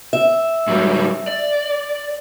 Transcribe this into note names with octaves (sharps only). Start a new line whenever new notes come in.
E5
G#2 F#3 G3
D5